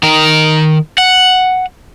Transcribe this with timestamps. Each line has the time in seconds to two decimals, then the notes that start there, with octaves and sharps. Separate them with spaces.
0.03 D#3 A#4
0.98 F#5